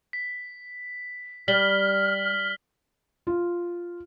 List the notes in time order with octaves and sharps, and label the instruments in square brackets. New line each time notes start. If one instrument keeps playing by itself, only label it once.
[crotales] B6
[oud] G3 [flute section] F6 [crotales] B6 F#7 G7
[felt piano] F4